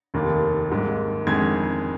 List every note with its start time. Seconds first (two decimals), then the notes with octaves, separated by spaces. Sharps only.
0.14 F1 D#2 D#3 A#3
0.70 G#1 G#2 G3 A#3
1.27 G1 F2 D#3 G#3 G#6